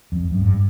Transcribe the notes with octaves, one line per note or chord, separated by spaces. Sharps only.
F2
F#2
G2